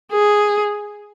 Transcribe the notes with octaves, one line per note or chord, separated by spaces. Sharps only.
G#4